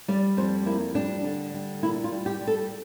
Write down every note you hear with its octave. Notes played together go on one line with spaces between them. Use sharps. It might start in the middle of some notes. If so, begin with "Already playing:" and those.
G3 D5
F2 C5
A#3 E4
G3 D4
D3
G3
A#2 E4
F4
G3
G4
G3
A4